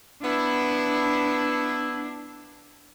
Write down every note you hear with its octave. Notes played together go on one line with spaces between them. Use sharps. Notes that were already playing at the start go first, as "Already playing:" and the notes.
B3 D4 E4